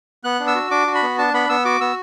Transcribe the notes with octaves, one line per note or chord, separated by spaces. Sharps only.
B3 F#6
D4
E6
F#4
D4 D6
F#4
B5
B3
D4 A5
B3 B5
B3 E6
F#4 D6
B3 E6